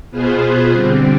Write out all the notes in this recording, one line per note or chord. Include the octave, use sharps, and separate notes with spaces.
B2 B3 F4 G#4 C5
D3 G3 C4